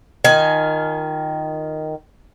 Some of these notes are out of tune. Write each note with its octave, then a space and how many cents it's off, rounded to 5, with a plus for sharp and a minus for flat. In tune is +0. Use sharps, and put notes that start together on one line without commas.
D#3 +0 F4 +0 G#5 +20